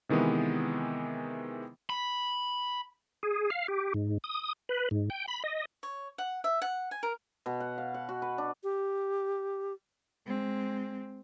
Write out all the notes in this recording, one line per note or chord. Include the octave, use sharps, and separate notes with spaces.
C3 D#3 E3 G#3 B3
B5
G#4
F5
G4
G#2
D#6
B4
G#2
G5
B5
D#5
C#5
F#5
E5
F#5
G#5
A#4
B2
F#5
F5
F#5
F#4
B4
D4
G4
G#3 C4